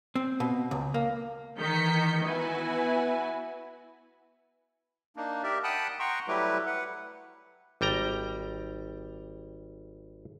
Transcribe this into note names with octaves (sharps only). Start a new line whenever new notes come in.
C4
B2
C#2
A#3
D#3 E3 G6 B6 C#7
B3 E4 F#4 B4 G#5
A#3 D4 D#4
G4 A#4 D5 E5
F#5 G5 A5 B5 D#6 F#6
F#5 G5 A#5 C6 C#6
F#3 G3 A3 E4 G4 B4
B4 F#5
G#1 G3 G5 A#5